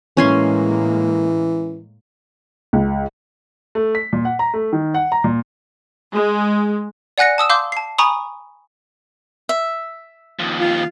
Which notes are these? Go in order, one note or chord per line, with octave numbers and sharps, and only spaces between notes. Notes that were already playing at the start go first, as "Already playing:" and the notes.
A2 E3 G#3 A#3 C#4 G#5 C6
C#2
A3
B6
A#2
F#5
A#5
A3
D#3
F#5
A#5
A#2
G#3
D5 F#5 G#5 F#6 A#6 C#7
A5 D#6 E6 E7
F5 C6 D6 E6 G6
A5 C7
G#5 A#5 B5 C#6 D#6
E5
D#2 F3
F4